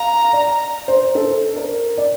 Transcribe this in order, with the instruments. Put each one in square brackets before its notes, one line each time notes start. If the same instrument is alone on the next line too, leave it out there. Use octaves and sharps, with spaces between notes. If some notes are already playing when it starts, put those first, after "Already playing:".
Already playing: [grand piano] F5 [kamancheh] A#5
[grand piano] D5
C5
A4
A#4
D5